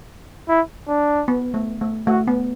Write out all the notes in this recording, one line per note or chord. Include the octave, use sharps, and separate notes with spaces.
E4
D4
B3
A3
A3
A3 F#4
B3